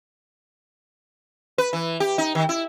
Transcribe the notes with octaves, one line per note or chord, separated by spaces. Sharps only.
B4
E3
G4
D#4
D#3
E4